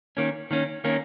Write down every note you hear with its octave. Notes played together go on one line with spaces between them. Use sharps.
D#3 A#3 C#4
D#3 A#3 C#4
D#3 A#3 C#4